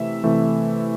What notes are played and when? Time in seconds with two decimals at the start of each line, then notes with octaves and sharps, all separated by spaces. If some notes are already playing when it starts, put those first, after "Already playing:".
Already playing: C3 E3 A3 E5
0.24 C3 E3 A3